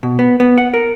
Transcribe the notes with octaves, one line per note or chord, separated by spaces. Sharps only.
B2
B3
B3
F#5
A#4